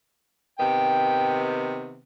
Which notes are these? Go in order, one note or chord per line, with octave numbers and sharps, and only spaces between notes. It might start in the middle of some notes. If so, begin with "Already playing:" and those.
C3 D#3 B3 G5